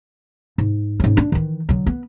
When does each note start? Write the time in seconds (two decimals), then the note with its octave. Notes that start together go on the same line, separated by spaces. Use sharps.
0.58 G#2
1.00 G#2 C#4
1.17 D4
1.32 D#3 E3
1.69 D3 F#3
1.86 B3